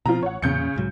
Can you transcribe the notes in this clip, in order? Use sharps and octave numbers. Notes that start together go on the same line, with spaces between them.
B2 F3 C4 F4 A#5
A1 C#5 F#5
E2 A#2 C#3 G6 C#7
B1 G#2 F#3